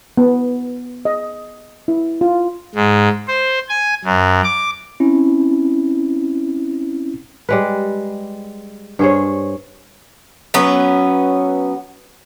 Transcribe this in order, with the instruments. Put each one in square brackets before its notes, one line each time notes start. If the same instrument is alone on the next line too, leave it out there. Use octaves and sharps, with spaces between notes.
[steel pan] B3
D#5
E4
F4
[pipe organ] G#2
C5
G#5
F#2
D6
[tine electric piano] C4 C#4 E4
[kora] G3 G#3 B4
G2 G#4 C5 C#5
[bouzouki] F#3 B3 C#4 B4